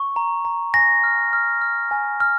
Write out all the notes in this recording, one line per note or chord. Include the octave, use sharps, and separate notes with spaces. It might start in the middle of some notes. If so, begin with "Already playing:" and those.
Already playing: C#6
A#5
A#5
G#5 A#6
F6
F6
F6
G#5
F6